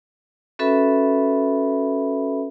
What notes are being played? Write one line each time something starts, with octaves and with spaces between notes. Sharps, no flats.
C#4 F#4 A4 B4 E5 B5